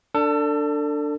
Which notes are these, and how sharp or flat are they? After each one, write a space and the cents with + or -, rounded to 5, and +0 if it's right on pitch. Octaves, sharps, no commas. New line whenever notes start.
D4 +0 A4 +30